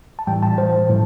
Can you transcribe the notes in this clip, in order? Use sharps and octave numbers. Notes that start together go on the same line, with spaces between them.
A5
A2 E3 G3 G5
A5
C5
A2 E3